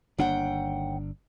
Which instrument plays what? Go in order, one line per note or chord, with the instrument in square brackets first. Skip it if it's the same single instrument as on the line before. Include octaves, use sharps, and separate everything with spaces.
[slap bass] G1 D4 [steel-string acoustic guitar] D#2 F#5 G5